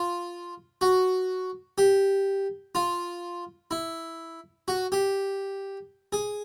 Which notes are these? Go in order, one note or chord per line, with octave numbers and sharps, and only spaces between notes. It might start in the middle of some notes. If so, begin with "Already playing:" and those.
Already playing: F4
F#4
G4
F4
E4
F#4
G4
G#4